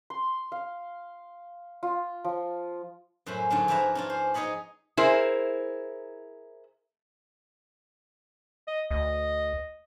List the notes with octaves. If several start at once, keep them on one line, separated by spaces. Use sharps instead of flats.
C6
F5
F4
F3
F#2 A2 C#4 C5 B5
G#2 D3 F#3 C#4 D4
F3 D4 E4 B4 E5 A#5
C#4 D4 F4
C5
D#4 G#4 C#5 D#5 B5
E4 G#4 A#4 C5
D#5
D2 D#5